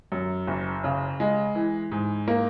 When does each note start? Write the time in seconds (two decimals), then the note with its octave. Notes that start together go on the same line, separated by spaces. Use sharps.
0.12 F#2
0.47 F#1
0.84 C#3
1.20 G#3
1.55 E3
1.91 G#2
2.28 A#3